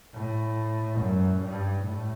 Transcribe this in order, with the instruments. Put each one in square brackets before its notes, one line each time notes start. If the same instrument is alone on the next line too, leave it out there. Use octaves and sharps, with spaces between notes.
[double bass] A2
F#2
G2
A2